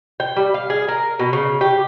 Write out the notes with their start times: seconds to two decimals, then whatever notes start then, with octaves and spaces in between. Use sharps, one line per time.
0.20 G5
0.36 G3
0.54 F5
0.70 G#4
0.88 A#4
1.19 B2
1.33 C#3
1.61 G4